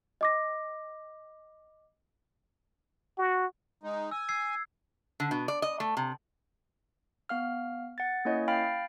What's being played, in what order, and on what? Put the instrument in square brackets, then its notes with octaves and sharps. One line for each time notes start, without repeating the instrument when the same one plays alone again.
[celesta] D#5 D6 A#6
[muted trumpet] F#4
[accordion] G#3 D#4
[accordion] G#5 [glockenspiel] E6
[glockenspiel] E6 G#6 C7
[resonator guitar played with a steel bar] D3
B2
D5
D#5
A3
C3
[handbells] B3 F5 F6
F#5 A6
A#3 C#4 E4 C#5 D#5
F5 G5 B5 F6 A6 C7